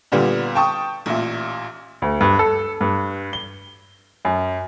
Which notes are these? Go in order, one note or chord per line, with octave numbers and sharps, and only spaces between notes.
A#2 D3 G3 B3
G5 A5 C#6 D#6
A1 A#2 E5
D2
G2
A4
G2
G7
F#2